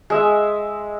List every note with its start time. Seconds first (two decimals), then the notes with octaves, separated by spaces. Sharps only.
0.10 G#3 E5